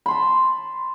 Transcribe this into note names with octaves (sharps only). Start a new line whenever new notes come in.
A5 B5 C6